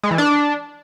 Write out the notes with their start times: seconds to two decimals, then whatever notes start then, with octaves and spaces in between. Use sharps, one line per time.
0.03 G#3
0.11 E3
0.18 D4